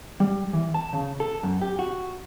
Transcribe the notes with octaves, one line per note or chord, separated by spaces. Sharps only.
G3
E3
A5
C#3
A4
F#2
G4
F#4